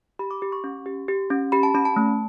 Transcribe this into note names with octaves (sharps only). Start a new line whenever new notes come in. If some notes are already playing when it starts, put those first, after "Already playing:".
G4 B5
D6
G4 D6
C#6
C#4
G4
G4
C#4
G4 B5
A5
C#4 B5
A5
A3